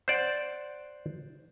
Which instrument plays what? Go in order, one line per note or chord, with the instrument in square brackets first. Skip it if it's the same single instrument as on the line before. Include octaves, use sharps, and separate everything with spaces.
[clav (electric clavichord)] C5 D5 F#5